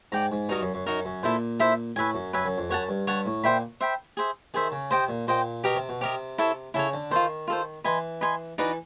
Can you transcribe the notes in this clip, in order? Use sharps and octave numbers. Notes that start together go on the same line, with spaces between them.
G#2 D5 G5 A#5
G#2
G2 D#4 F#4 A#4 D#5
F#2
F#2
F#2 D#4 F#4 A#4 D#5
F#2
A#2 E4 A4 C5 E5
E4 A4 C5 E5
A2 B4 E5 G#5
F#2
F#2 B4 E5 G#5
F#2
F2
F#2 C#5 F#5 A5
G2
G2 C#5 F#5 A5
A2
A#2 C5 E5 G5 B5
C5 E5 G5 B5
G#4 C5 E5
D#3 G#4 C5 E5
C#3
C3 C5 D#5 G5
A#2
A#2 C5 D#5 G5
B2 G4 A#4 D#5
C3
B2
C3 G4 A#4 D#5
E4 A4 C#5
C#3 E4 A4 C#5
D3
D#3 F4 A4 C5
F4 A4 C5
E3 B4 D#5 G#5 C6
B4 D#5 G#5 C6
E3 D#4 F#4 B4 D5